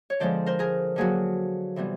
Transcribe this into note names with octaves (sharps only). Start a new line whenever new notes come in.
C#5
D3 F3 G#3 B3 C5 D5
A#4 C5
G#4 A#4
D3 F#3 A#3 F#4 G#4
C3 E3 G3 B3